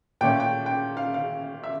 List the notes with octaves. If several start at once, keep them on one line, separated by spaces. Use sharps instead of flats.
A#2 A3 C#4 G5
G5
G5
F5
F5
E5